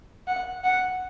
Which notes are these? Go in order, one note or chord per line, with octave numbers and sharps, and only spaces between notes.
F#5
F#5